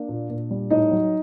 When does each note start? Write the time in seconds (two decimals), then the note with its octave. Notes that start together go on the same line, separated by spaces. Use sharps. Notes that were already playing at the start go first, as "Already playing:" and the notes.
Already playing: A#3 D4
0.09 A#2
0.30 A#2
0.51 G3
0.70 A2 D#4 D#5
0.91 F#3